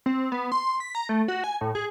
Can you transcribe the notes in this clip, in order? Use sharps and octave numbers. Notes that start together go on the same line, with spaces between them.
C4
B3
C6
B6
A#5
A3
F#4
G#5
A2
G#4